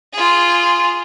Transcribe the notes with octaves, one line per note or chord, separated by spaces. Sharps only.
F4 G#4